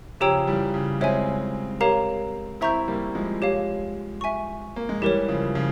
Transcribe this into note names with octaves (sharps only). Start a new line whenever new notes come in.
C#3 F3 G4 C#5 G5 A#5 E6
E3 G3
C#3
G#3 C4 C#5 E5 G#5
G4 A#4 C#5 F5 A#5
C4 E4 E5 A#5 C#6 G6
G3 A#3
F3 G#3
G4 C#5 F5
E5 G#5 C#6
A#3
G#3
E3 G3 G4 A#4 C#5
C#3 F3
C#3 F3